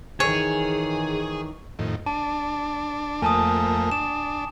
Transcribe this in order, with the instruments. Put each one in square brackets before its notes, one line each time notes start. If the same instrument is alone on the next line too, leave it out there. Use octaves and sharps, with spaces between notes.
[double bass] D#3 E3 [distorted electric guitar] G#4 [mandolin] C#5 [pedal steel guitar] G#5
[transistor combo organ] F2 A2 D#3
[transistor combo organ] D4 [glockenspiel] A5
[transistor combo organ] F2 A3 A#3 [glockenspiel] G#5 A5 D#6
[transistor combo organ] D4 [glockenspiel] E7